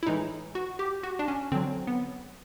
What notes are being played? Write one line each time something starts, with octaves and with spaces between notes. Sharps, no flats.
E4
A2 E3 G#3 D#4
F#4
G4
F#4
D4
C#4
D3 F#3 C4
B3